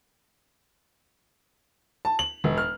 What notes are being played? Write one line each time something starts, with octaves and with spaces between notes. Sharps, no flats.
A5
F#7
E1
F6